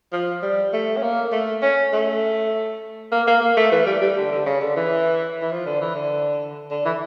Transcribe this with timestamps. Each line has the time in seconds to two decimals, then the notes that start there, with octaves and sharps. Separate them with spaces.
0.13 F3
0.42 G3
0.73 A3
0.97 C#4
1.02 A#3
1.32 A3
1.62 C#4
1.93 A3
3.12 A#3
3.27 A#3
3.41 A#3
3.57 A3
3.72 E3
3.86 G3
4.01 G3
4.17 D3
4.32 D3
4.46 C#3
4.61 D3
4.76 E3
5.42 E3
5.51 F3
5.66 D3
5.81 E3
5.95 D3
6.71 D3
6.85 E3